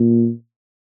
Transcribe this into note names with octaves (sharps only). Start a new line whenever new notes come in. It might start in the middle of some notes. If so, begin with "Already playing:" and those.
Already playing: A#2